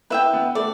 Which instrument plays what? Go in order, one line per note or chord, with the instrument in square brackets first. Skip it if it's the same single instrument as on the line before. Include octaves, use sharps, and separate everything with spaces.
[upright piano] E4 [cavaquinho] B4 E5 G5
[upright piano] B3
[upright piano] A3 [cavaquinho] D5